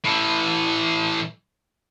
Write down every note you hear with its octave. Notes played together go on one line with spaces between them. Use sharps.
A2 E3